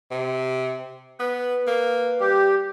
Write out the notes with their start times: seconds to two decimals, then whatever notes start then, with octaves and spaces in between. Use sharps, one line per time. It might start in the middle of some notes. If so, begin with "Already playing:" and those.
0.11 C3
1.20 B3 B4
1.67 A#3
2.20 G3 G4